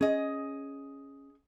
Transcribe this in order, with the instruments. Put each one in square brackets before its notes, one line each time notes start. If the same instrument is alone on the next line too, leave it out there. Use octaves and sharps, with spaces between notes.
[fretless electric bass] C#4 [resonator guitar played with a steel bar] G#4 D#5